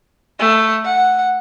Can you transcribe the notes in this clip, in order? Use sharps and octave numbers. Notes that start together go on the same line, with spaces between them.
A3
F#5